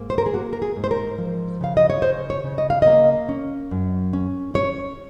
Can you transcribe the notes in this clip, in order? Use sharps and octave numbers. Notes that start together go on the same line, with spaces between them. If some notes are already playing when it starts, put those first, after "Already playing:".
Already playing: G#2 A#3
C5
A#4
G#4
A#3 F#4
A#4
G#4
G#2
C5
A#4
F3
C#3 F5
D#5
C#5
C#3 C5
C#5
C#3
D#5
F5
A#3 D#5
C#4
F#2
C#4
C#4 C#5